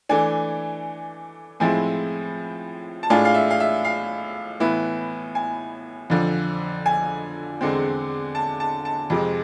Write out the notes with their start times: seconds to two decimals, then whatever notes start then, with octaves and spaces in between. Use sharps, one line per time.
0.09 E3 A3 D4 G#5
1.60 A2 F3 G#3 C4 E4 G#5
3.03 A5
3.10 A2 G#3 D4 F4 G#5
3.25 F5
3.35 E5
3.50 F5
3.60 E5
3.85 F5
4.60 A2 E3 B3 E4
5.35 G#5
6.10 F2 D3 F3
6.86 G#5
7.61 E2 D3 G#3 C4
8.35 A5
8.60 A5
8.85 A5
9.10 F2 C3 G#3